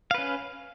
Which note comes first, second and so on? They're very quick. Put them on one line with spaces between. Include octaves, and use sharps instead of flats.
F5 B4 C#4